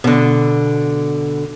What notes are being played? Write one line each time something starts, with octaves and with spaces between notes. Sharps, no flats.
B2 D3